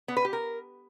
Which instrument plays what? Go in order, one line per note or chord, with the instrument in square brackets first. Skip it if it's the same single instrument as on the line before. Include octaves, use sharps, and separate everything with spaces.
[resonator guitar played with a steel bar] B3
B4
G4
A#4